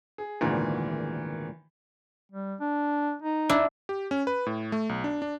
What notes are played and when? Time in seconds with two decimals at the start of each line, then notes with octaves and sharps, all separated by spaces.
0.18 G#4
0.41 G#1 D2 A#2 D#3 E3
2.32 G3
2.60 D4
3.22 D#4
3.49 D4 E4
3.89 G4
4.11 C#4
4.27 B4
4.46 A2
4.72 A3
4.89 B1
5.04 D4
5.22 D4